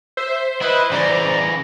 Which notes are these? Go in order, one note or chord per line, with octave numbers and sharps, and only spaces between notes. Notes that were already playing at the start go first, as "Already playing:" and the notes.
C5 E5
E4 B4 D#5
C#3 E3 D5 A#5